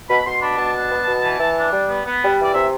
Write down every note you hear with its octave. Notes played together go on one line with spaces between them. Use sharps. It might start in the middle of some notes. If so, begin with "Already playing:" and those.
B2 B5
B2 C6
D4 B5
B2 A5
D4
B3
B2
E3
E3
D4
G3
B3
B3
G3
E3 D5
C3 E5